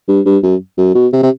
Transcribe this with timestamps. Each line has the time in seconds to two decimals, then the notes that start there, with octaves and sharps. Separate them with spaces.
0.08 G2
0.26 G2
0.43 F#2
0.78 F#2
0.95 B2
1.13 C3
1.23 C3